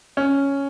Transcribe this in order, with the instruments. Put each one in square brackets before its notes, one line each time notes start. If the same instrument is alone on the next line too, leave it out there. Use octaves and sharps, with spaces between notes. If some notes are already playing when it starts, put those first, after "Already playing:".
[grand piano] C#4